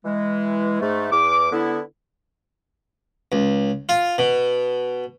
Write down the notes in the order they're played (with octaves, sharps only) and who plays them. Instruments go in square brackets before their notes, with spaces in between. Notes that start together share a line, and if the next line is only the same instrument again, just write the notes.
[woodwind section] E3 G#3
G#2 A3
E2 D6
D3 B3 E4
[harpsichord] C#2
F4
B2